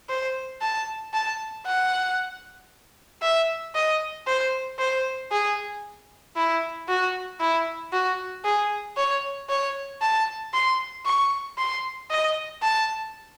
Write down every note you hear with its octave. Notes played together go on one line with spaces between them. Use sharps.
C5
A5
A5
F#5
E5
D#5
C5
C5
G#4
E4
F#4
E4
F#4
G#4
C#5
C#5
A5
C6
C#6
C6
D#5
A5